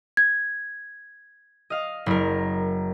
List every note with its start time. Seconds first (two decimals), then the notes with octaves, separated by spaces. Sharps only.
0.17 G#6
1.70 D#5 F5
2.06 F#1 A#4